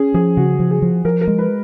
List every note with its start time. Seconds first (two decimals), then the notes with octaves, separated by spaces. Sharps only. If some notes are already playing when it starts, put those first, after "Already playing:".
Already playing: C#4 G#4
0.14 F3 G#4
0.37 C#3 F#4
0.59 F3
0.71 G#4
0.82 F3
1.05 F3 A#4
1.21 A#4
1.27 G#3
1.39 B4